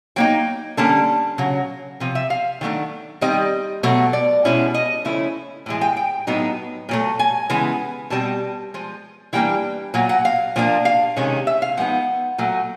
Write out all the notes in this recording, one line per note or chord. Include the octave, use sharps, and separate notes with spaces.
F#3 A#3 D#4 G5
D3 G3 A#3 C#4 A5
C#3 F#3
C3 F3
E5
F5
D#3 F#3 A3 D4
D#3 G3 C4 D#4 D#5
B2 F#3 A3
D5
B2 G#3 C#4 E4
D#5
C#3 F3 A3 C#4 E4
A2 E3 G#3
G5
G5
A2 F#3 B3 D#4
A#2 F#3 A3
G#5
C#3 E3 G#3 B3
B2 G3 C4 A5
F3 G#3
E3 G3 A#3 D4 G5
A#2 F#3
F#5
F5
A#2 F3 A#3 D4
F5
C3 D#3 G#3 C#4
E5
F5
F3 G#3 B3 D#4 F#5
A#2 F#3 A3